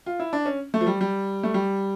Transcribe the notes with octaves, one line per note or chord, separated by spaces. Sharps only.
F4
E4
D4
C#4
A3
F3
G3
G3
A3
G3